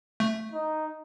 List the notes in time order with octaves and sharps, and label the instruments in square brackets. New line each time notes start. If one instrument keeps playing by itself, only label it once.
[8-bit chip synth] A3
[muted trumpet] D#4